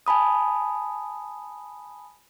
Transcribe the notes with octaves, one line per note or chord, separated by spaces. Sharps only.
G#5 A5 B5 D#6